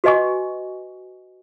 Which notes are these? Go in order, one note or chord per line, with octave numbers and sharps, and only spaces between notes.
F#4 B4 D#5 G#5 C#6